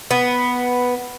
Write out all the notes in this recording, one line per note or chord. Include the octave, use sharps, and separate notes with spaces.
B3